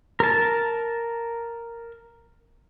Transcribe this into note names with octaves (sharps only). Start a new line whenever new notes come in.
A#4 A5